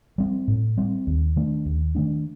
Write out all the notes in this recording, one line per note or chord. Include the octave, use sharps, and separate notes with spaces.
G3 C4
A2
G3 C4
D#2
D#3 A3 D4
D#2
D#3 A3 D4